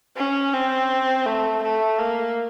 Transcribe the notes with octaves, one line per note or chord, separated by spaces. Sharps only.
C#4
C4
A3
A3
A#3